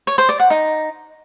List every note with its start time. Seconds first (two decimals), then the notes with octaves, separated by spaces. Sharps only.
0.07 C#5
0.18 C5
0.29 D5
0.40 F#5
0.50 D#4